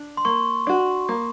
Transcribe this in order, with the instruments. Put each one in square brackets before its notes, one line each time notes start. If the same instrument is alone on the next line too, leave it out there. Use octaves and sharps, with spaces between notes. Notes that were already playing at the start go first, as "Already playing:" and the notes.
Already playing: [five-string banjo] D4
[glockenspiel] C6
[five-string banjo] A#3 [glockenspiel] C#6
[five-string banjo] D4 F#4
A#3